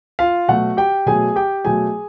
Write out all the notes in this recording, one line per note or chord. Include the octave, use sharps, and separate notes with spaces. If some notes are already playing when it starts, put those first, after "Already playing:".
F4 F5
B2 F#3 A3 F#4 F#5
G4 G5
B2 F#3 A3 G#4 G#5
G4 G5
B2 F#3 A3 G#4 G#5